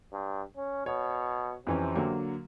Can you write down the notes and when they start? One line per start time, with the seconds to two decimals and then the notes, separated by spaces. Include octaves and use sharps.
0.13 G2
0.57 C#4
0.86 B2 C#5
1.67 F2 C3 E3 C#4
1.96 D3 F#3 A#3